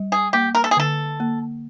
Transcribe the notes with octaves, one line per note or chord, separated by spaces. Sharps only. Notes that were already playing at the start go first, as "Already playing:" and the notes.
Already playing: G3
G#4
A#3 G4
A#4
A4
G#4
D3 A4
A#3